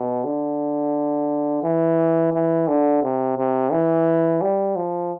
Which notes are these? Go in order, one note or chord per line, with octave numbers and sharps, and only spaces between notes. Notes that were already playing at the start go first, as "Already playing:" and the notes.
Already playing: B2
D3
E3
E3
D3
C3
C3
E3
G3
F3